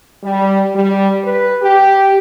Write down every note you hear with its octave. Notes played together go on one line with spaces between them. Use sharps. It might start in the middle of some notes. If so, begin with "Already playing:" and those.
G3
G3
B4
G4